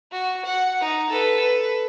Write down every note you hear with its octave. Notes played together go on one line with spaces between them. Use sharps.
F#4
F#5
D#4
A4 B4
B4